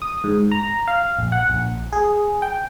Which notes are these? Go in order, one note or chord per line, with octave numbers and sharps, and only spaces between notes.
D#6
G#2
A#5
F5
A#1
F#5
A#1
G#4
G5